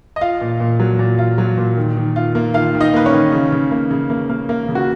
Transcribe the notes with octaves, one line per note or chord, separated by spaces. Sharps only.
D#5
F4 F5
A#2
A#2
F#3
A#2
F4
F#3
A#2
D#3
D#3
F4
A#3
D#3 F4 F5
D#3
D#4 D#5
A#3 B4
C#4 C#5
D#3
C#3
C#3
A#3
C#3
A#3
A#3
A#3
C#3
F#4